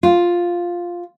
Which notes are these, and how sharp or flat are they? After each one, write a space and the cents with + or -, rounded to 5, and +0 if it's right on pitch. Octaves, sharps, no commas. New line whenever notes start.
F4 +5